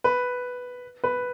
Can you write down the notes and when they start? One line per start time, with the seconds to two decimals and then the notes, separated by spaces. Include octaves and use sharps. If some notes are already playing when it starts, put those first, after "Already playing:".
0.04 B4
1.04 B4